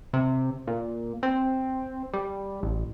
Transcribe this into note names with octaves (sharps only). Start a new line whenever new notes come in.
C3
A#2
C4
G3
A1